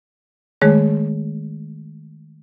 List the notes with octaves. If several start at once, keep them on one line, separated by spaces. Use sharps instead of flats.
D#3 G#3 A3 G#4 C#5